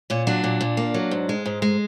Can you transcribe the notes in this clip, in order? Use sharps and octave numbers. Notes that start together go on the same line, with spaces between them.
A#2 C#4
F#3 D4
A#2
A#2
A#3
F#3
G#2
G#3
G#2
G#3